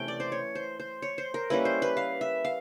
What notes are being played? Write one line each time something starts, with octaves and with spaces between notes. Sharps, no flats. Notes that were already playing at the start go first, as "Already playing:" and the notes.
Already playing: C3 E3 A3 C#4 G5
D5
C5
C#5
C5
C5
C#5
C5
A#4
G3 A#3 C#4 E4 B4
C5
B4
F5
E5
F5